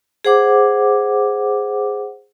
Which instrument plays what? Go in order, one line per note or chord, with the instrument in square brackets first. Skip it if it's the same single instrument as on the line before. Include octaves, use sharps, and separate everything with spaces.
[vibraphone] G#4 C5 F#5 D6